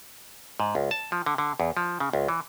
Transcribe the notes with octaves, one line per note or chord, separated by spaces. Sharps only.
G#2
C#2
A5
F3
D3
D3
E2
F3
C#3
C#2
E3